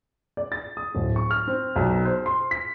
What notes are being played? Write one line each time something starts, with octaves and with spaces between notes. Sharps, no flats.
D5
A6
D#6
D1
C#6
F6
C4
B1
C5
C6
B6